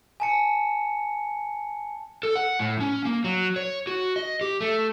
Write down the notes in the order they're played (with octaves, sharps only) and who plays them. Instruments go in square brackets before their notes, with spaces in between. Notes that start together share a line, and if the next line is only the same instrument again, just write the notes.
[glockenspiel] G#5 A5 C#7
[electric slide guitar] A4
F#5
A2
C#4
A#3
F#3
C#5
F#4
D#5
G4
A3